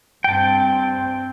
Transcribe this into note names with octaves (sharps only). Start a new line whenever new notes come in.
G2 C4 G5 A5